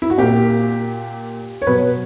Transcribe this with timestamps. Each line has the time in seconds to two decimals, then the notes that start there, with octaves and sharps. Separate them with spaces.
0.02 E4
0.10 F#4
0.18 A#2 A#3 G4
1.62 C#5
1.67 B2 F#3 B3 B4